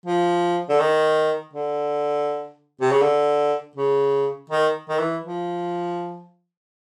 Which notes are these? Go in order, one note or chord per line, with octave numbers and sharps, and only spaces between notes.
F3
D3
D#3
D3
C3
C#3
D3
C#3
D#3
D#3
E3
F3